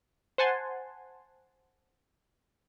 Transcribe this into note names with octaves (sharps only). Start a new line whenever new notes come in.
C5 F#5 G#5 A5 C6